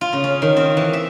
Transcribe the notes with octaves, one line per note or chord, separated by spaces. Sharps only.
F4
C#3
C#4
D#3
C4
E3
E5